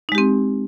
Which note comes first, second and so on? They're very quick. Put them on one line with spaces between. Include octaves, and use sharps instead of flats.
D#4 G#3 G4 C4